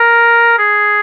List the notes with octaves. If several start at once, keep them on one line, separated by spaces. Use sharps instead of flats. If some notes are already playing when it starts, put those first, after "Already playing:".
Already playing: A#4
G#4